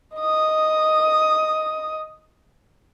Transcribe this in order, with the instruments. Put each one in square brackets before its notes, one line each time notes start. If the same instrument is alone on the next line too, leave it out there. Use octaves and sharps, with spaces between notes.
[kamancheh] D#5 D#6